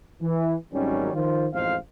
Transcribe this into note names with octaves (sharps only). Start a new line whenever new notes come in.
E3
G#1 D#3 F#3 G3 C#4
D#3 F3 F4 C5
A1 F2 G#2 C5 F5